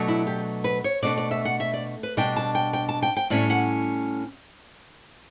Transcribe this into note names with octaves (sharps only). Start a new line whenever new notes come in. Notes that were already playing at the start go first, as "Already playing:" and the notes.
Already playing: B2 F#3 A3 D4
E4
G4
B4
C#5
B2 A3 D4 D5
D5
E5
F#5
E5
D5
B4
B2 G3 D4 G5
A5
G5
G5
A5
G5
G5
A2 G3 C#4 D5
F#5